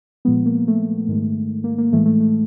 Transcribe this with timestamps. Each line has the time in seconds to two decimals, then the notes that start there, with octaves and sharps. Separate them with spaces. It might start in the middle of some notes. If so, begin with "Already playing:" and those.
0.25 A#2 F3 G#3 B3
0.46 A#3
0.67 A3
1.08 G#2 D#3 G#3
1.64 A#3
1.78 A#3
1.93 A2 E3 G#3 A3
2.06 A3
2.20 A3